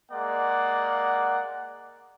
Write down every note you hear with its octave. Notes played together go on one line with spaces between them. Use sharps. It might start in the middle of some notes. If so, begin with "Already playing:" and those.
G#3 A#3 D5 F#5